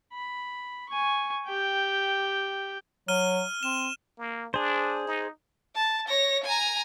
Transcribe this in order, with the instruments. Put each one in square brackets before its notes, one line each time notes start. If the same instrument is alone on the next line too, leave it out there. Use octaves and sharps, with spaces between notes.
[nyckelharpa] B5
G#5 C#6
G4 G5
[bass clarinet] F#3 [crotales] F6 D#7 G7
[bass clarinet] C4 [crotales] E7
[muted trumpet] A#3
[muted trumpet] D4 [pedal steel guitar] G#4 C5
[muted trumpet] D#4
[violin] A5
C#5 A#6
G#5 A#5